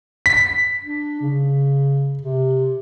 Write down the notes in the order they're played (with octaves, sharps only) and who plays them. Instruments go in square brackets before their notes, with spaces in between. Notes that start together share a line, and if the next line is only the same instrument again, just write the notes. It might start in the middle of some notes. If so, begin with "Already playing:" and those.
[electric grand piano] B6
[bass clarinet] D4
C#3
C3